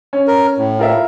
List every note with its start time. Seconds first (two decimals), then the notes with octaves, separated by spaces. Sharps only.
0.13 C#4
0.27 A#4
0.58 A2
0.79 F4 A#4 E5